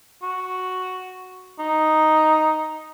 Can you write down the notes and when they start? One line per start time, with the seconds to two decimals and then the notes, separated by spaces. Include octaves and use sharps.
0.22 F#4
1.59 D#4